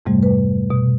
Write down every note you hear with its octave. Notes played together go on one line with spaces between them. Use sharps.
F2 G#2 C3 G3 A3
B4
B2